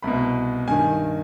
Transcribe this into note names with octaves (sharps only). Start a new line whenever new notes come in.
C2 B2 B5
G2 D#3 G#5